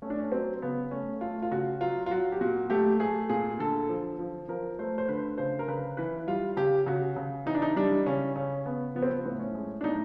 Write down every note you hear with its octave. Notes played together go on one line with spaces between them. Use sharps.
A3 C#4
D4
C#4
F#3 C4
C#3 B3
A3 C#4
A3 F4
F4
C#3 F#4
F#3 F4
F4
F#3 F#4
G4
A#2 F#4
A3 G4
A3 G#4
A#2 G#4
D3 A4
F3
F3
F3 A#4
A3 C5
C5
D3 B4
C#3 C5
A#4
C#3 B4
E3 B4
G3 F4
C#3 G4
C#3 F#4
C#3
E3 D#4
D4
D#4
G3 D4
C#3 C#4
C#3 C#4
C#3 B3
F3 B3
C4
B3
A2
C#4
G#3
D4
A2 D#4